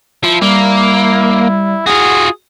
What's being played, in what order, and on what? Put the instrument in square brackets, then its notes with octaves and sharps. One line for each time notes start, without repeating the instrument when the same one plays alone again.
[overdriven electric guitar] F3 [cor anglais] E4 [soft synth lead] E5
[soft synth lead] G3 [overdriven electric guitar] A#3
[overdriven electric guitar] F4 F#4 [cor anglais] G#4